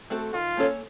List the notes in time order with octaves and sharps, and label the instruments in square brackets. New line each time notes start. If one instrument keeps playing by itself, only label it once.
[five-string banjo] A3 C4 F#4 A4
[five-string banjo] D#3 [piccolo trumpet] F4
[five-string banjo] A#3 C#4 A4 C#5